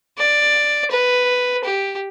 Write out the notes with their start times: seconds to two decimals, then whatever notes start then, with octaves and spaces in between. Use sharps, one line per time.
0.18 D5
0.91 B4
1.64 G4